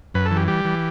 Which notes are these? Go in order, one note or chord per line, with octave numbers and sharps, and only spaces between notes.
F#2 B4
A4
E3
G4
G3 G4
E3